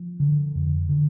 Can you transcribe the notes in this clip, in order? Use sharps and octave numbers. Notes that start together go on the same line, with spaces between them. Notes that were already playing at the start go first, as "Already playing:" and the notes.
Already playing: F3
D3
F2
D3